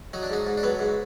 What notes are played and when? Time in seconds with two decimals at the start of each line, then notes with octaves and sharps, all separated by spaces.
0.13 F#3 D#4
0.23 D4
0.30 G#2 D#4
0.47 G#2
0.57 D4
0.63 F#3 B3
0.79 G#2